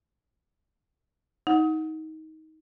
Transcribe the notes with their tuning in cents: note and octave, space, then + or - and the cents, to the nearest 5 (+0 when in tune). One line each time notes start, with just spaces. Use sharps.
D#4 +20 F#5 -10